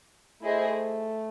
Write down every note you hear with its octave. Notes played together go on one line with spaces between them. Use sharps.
A3 E4 G#4 C5 D#5